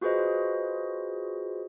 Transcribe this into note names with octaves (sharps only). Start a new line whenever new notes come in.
F4 F#4 G#4 B4 C5 D#5